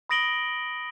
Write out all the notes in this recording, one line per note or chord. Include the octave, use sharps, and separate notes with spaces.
B5 D#6 A#6 D7 F#7 G7